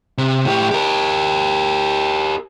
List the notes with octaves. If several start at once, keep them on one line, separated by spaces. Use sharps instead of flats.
C3
A2 G4
G4 A#4